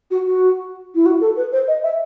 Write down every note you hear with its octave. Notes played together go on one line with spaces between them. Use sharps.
F#4
F#4
E4
F#4
A4
B4
C5
D#5
E5